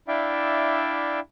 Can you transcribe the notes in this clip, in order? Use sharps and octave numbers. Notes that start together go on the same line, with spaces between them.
D4 E4 D5 E5 F5 G5